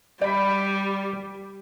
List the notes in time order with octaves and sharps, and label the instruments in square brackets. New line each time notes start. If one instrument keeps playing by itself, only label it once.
[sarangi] G3 [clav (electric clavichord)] D5 [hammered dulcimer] G5 B5